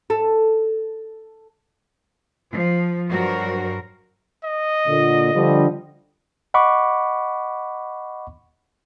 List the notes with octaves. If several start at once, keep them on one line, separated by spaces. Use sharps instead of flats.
A4
F3
G2 F#3 F#4 A#4 C5
D#5
A#2 D3
D3 F3 G3
D#5 F#5 B5 C#6 D6